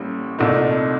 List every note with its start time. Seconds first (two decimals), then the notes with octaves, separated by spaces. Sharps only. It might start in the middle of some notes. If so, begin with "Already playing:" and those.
Already playing: A1 A2 G3 A#3
0.39 C2 A#2 A3 D#4